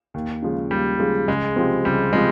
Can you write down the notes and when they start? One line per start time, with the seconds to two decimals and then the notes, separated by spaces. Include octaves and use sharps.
0.14 D#2
0.42 C#3 F3 G#3
0.71 D#2 G3
0.99 C#3 F3 G#3
1.28 C#2 G#3
1.56 C3 F3 C4
1.85 C#2 G3
2.13 C3 F3 G#3